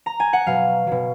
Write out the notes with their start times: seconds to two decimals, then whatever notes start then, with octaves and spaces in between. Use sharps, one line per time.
0.06 A#5
0.20 G#5
0.33 F#5
0.46 B2 F#3 F5
0.87 B2 F#3